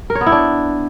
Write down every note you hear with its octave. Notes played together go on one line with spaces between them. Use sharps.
A#4
C#5
B3
E4
D4